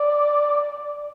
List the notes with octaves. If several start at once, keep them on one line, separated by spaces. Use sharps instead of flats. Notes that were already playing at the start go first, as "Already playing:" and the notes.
Already playing: D5